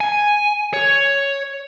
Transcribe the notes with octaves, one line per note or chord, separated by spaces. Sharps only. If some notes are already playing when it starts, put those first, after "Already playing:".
G#5
C#5